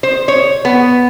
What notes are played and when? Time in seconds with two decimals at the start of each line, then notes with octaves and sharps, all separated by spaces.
0.03 C5
0.28 C#5
0.65 B3